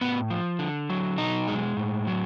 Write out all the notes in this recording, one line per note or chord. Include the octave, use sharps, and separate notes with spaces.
A2 B3
F3
D3
F#3
B2 D#4
G#3
A2
F#3